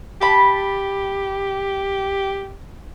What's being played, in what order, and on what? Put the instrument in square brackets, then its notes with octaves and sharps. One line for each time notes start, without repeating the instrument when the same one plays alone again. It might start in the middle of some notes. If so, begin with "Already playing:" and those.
[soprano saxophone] G4 [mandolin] A5 B5